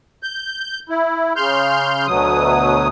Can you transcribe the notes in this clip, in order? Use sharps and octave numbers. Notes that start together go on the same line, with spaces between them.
G6
E4
C#3 C6 F6 G6
D2 B2 F#3 D#6